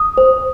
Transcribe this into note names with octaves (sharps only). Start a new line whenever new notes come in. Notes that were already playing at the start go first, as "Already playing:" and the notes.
Already playing: D#6
C5